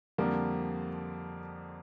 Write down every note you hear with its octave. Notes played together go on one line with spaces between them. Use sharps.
F2 D3 F3 G3 A#3